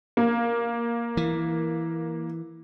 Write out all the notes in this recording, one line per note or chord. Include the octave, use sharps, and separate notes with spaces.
A#3
E3